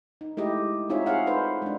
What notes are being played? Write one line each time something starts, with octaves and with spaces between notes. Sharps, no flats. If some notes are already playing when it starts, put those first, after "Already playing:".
D#4
G#3 A3 E4 G4 D#5
C4 D#4 F4 G#4 C#5 E5
G#4 C#5 F5 F#5
D#4 A4 B4 C5
G#3 D4